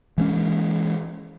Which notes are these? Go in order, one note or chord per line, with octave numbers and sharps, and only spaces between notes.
E3 G#3 C#4